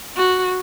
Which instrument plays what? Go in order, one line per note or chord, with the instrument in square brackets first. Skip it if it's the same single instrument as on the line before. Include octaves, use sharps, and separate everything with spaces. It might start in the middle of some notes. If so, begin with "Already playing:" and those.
[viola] F#4